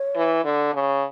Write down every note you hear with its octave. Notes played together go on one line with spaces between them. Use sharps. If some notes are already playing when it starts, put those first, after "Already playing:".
Already playing: C#5
E3
D3
C#3